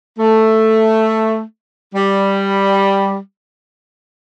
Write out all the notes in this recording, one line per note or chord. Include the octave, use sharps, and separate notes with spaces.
A3
G3